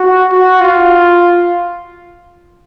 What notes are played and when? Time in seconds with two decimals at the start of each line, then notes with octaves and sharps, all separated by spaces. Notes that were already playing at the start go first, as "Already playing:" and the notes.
Already playing: F#4
0.32 F#4
0.60 F4